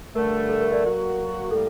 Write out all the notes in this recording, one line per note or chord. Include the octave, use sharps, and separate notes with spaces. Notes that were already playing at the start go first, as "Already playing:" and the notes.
G2 D3 A3 A#4
A4
A#4
A#4 D5
F#3 A#3 F#4 A#4
A2 G3 A#3 A4